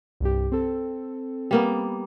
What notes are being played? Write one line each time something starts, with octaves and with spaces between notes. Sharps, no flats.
C2 G2 G4
C4 A4
G3 A#3 B3